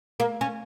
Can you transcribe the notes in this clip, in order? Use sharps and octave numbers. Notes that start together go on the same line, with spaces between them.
A#3
C#4